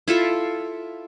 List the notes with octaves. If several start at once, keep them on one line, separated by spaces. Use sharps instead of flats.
E4 F4 A4 E5